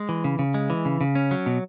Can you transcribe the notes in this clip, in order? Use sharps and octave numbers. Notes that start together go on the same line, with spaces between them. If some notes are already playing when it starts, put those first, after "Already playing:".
Already playing: G#3
E3
C#3
C#3
G#3
E3
C#3
C#3
C#4
F#3
B2